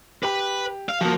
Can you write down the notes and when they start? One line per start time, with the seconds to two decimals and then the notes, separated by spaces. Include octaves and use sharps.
0.23 G4 B4 B5
0.89 F5
1.01 F3 A#3 F#4